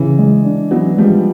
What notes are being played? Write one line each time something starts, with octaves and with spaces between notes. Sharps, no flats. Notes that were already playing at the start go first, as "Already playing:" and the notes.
Already playing: C#3 E3
G#3
D4
E3 F#3 B3
F3 G3 G#3